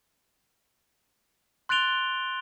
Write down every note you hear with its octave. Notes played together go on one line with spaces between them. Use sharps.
C6 F#6 A6 D7 F7 G7